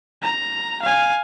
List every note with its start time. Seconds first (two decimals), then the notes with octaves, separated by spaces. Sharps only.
0.22 A#5
0.82 F5 G#5